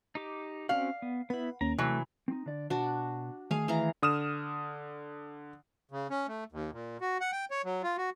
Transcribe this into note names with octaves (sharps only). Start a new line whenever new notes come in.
D#4 G4 D6
C4 C#4 F#4 D5 F5
B3
B3 E4 B4 F#5
D#2 A#3 C#4 A#5
C3 E3 F#3 A3
C4 D#4
D3 D5
B2 D4 F#4
D#3 A3 G#4 F5
E3 F5 A#5
D3 D#6 F6 E7
C#3
C#4
A3
D#2
A#2
F#4
F#5
G5
C#5
F#3
F4
F#4